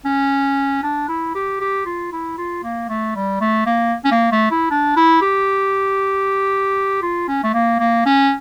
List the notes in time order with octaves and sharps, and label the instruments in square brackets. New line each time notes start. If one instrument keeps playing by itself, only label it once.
[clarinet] C#4
D4
E4
G4
G4
F4
E4
F4
A#3
A3
G3
A3
A#3
C#4
A#3
A3
E4
D4
E4
G4
F4
C#4
A3
A#3
A#3
C#4